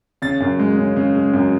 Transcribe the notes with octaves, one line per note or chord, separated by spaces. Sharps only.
C#3 A6
F#2
G#3
C#3
C#3
G#3
F#2